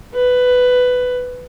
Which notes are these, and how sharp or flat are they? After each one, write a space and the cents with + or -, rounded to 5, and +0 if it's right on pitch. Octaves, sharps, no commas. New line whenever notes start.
B4 +10